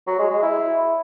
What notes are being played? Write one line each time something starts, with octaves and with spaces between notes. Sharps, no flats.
F#3
G#3
G#3
E4